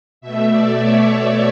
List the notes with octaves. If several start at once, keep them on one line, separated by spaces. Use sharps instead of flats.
B2 A3 E5
D5
C#5